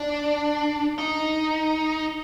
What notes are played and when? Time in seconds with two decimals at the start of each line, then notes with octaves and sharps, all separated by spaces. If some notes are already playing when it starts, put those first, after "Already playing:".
Already playing: D4
0.98 D#4